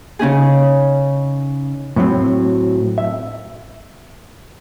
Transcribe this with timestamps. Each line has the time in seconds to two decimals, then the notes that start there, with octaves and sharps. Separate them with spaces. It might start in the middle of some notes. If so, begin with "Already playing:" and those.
0.19 C#3 C#4 D#4 G#4
1.96 A2 F#3 C4
2.98 E5